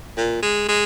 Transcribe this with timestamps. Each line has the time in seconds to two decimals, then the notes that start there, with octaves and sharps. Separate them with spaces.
0.18 A#2
0.43 G#3
0.69 G#3